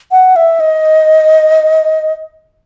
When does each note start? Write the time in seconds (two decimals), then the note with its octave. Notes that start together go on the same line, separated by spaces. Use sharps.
0.12 F#5
0.36 E5
0.60 D#5